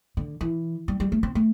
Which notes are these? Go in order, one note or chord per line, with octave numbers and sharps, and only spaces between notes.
D3
E3
G3
G3
A3
C4
A3